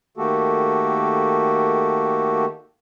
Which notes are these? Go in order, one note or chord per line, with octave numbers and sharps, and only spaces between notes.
D#3 A3 A#3 F#4 G4 A4